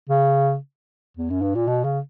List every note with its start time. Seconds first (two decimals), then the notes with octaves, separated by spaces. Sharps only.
0.09 C#3
1.17 E2
1.30 F#2
1.42 G2
1.55 A#2
1.68 B2
1.84 C#3